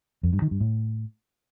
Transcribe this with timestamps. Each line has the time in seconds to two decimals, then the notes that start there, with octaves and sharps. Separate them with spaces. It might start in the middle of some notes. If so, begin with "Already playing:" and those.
0.23 F2
0.33 G2
0.42 D#3
0.51 G2
0.61 A2